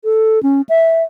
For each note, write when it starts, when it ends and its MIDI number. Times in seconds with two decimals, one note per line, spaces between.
0.04 0.42 69
0.43 0.61 61
0.69 1.03 76